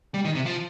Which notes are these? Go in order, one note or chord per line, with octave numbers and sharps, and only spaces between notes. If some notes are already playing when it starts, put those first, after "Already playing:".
G3
D#3
C3
F3